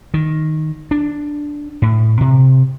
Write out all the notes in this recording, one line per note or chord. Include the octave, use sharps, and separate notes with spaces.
D#3
D4
A2
C3